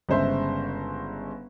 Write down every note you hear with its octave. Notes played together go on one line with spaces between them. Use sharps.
G1 C#3 G#3 C5 E5